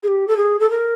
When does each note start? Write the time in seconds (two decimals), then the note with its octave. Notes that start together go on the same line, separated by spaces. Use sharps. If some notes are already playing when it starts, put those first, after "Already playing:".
0.03 G#4
0.07 G4
0.27 A4
0.36 G#4
0.59 A4
0.70 A#4